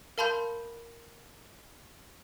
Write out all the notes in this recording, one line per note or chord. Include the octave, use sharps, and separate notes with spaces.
A#4 F5 A5 B5 C6 G6